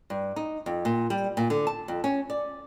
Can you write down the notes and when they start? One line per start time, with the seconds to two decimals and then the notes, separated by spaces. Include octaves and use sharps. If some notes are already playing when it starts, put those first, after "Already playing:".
0.10 G2
0.36 D#4
0.66 F2
0.85 A#2
1.10 G3
1.37 A#2
1.50 D3
1.67 A5
1.88 F2
2.04 C#4
2.30 D5